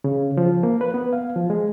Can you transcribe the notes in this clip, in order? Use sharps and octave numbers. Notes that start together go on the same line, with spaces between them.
C#3
F3
A#3
B4
B3
F5
F3
G#3